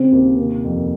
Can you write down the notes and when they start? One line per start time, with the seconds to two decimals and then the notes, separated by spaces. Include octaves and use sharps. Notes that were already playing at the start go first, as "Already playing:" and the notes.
Already playing: C#3 C4
0.12 D#2
0.38 C3 A#3
0.64 F2